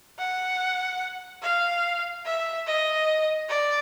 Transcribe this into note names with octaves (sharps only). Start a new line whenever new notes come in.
F#5
F5
E5
D#5
D5